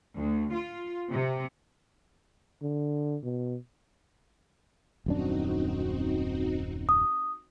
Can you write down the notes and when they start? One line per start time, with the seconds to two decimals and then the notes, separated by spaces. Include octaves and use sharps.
0.18 D2
0.55 F4
1.12 C3
2.62 D3
3.23 B2
5.06 D#1 F#2 C4 D4 D#4 F#4
6.89 D#6